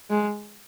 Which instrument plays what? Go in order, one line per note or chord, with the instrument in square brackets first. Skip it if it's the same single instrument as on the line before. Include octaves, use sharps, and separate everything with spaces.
[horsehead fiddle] G#3